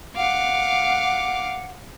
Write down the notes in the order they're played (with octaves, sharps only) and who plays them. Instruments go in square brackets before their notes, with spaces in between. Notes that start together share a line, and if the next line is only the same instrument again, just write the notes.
[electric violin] F5 D6 [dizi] F#5